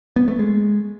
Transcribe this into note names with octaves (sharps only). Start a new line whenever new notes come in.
B3
A3
G#3